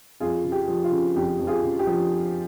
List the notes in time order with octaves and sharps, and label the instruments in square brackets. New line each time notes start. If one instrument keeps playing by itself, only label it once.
[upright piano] F2 F4 G#4
C#3
G4
F3
F4
C#3
F2 G4
F2
F4 G#4
C#3
G4
F3